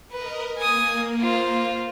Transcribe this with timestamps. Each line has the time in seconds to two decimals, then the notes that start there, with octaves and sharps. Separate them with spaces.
0.12 A#4 B4 D#5
0.58 A#3 G#5 D#6
1.21 F4 C5